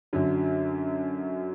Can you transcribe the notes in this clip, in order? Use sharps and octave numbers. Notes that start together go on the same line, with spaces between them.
F#2 D3 F#3